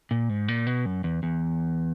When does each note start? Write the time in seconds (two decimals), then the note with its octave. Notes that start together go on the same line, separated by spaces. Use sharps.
0.11 A#2
0.29 G#2
0.48 A#2
0.67 B2
0.86 F#2
1.04 E2
1.23 E2